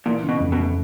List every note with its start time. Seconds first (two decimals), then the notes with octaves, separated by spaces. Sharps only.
0.06 A#2 E3
0.23 C#3
0.29 B2
0.40 F2
0.52 B2
0.58 A3